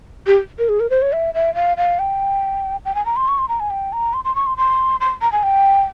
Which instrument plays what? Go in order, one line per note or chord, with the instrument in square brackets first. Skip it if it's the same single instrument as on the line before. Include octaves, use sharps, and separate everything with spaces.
[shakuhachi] G4
A#4
G#4
A#4
C5
C#5
E5
E5
F5
F5
G5
G5
G#5
A#5
C6
C#6
C6
A#5
G#5
G5
A#5
C6
C6
C#6
C6
C6
C6
A#5
G#5
G5